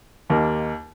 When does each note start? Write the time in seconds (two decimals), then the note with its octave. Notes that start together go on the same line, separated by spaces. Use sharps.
0.30 D#2 D#3 A#3 G4 A#4